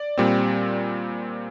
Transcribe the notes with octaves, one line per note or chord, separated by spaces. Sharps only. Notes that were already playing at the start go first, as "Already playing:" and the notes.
Already playing: D5
A#2 G3 C4